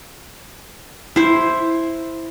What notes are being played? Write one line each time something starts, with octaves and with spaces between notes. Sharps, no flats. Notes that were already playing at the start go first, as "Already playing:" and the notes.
E4 C5